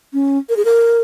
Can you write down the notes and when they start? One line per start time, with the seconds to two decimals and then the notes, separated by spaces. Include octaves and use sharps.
0.13 C#4
0.49 A#4
0.57 G#4
0.65 A#4